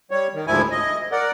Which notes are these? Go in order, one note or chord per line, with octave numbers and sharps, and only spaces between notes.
G3 C#5
D#3
D2 G#2 F3 E4 G#5
D#5
A#4 D5 F#5